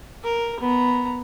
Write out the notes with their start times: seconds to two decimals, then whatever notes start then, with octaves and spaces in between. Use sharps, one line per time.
0.24 A#4
0.61 B3 A#5